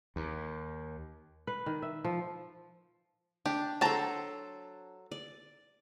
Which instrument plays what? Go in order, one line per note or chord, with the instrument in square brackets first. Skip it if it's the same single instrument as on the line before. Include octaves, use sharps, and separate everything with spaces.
[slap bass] D#2
[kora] B4
D#3
E5
F3
[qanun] D4 [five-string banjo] G4
[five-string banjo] F#3 A5 A#5 [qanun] A4 C5
[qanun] D5